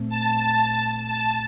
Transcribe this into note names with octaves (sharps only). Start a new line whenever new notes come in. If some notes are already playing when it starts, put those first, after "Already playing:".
Already playing: A#2 A3 C4
A5
A5